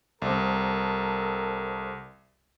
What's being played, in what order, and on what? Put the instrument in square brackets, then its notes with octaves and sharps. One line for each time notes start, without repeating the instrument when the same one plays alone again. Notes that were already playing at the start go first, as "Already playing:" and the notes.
[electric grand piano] C2 C4 [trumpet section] A4 A#4